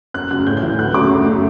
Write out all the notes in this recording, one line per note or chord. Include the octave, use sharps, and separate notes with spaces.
F#2 F#6
C#3 F#3 F#6
A2 G6
G6
E3 A3
D2 F#6
C#3 F#3 A3 D6
F#2
C#3 F#3 A3